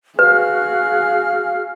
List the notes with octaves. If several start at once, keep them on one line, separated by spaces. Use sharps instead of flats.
F#4 G#4 B4 F5 F6